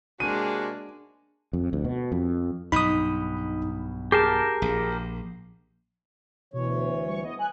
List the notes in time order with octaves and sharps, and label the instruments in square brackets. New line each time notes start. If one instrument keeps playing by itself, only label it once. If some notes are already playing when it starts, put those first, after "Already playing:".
[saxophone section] C3 A#3 F#4 [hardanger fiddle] G#3 D4 [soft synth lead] G#4 [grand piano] D#7
[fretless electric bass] F2
D2
B2
F2
[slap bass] B1 G2 [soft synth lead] D#4 [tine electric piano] B5 D#6
[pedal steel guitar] G4 A#4 A5 [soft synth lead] G#4 [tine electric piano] C7
[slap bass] A#1
[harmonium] D2 E3 C#5 [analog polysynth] B2
[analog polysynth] G3 C#6
B3 D#5
G#5 F#6